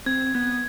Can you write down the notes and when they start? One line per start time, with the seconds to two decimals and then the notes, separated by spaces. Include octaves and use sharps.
0.06 C4 G#6
0.35 B3 G#6